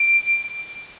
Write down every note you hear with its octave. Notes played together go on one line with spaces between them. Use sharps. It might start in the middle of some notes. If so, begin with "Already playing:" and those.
Already playing: D7